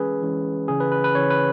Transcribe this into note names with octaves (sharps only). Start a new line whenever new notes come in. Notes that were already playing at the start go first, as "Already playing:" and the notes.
Already playing: E3 G#3 C#4 G#4 B4
E3 G#3 C#4
C#3 E3 C#4 G#4
B4
B4
B4
C#3 E3 C#4 C#5
B4